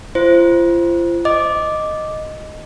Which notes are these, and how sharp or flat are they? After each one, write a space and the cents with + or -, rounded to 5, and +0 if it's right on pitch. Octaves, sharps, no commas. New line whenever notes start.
F4 -40 C5 +0
D#5 +0 D6 +0